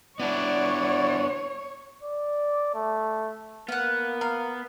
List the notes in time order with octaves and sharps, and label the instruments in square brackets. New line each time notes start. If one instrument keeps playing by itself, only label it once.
[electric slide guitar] B3 D4 [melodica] E4 F#4 [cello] C#5 [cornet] D5
[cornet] D5
A3
[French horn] A#3 [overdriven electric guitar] B3 [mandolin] F5 F#5
[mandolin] F5 [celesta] A#5